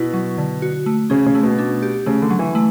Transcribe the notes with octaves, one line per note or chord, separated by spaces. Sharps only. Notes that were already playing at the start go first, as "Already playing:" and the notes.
Already playing: B2 E4
F#3
D3
F#4
A3
C#3 C#4
C#3
A3
B2
D4
G4
C#3 A3
D3
F#3
E3
A3